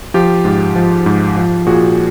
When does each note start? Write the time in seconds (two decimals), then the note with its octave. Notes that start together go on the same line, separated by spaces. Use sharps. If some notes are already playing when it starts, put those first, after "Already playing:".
0.14 F3 F4 G4
0.45 G#2
0.76 F3
1.06 G#2
1.36 F3
1.66 A#2 F#4 G#4